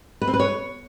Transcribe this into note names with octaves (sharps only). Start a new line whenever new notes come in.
B4
C4
B4
C#5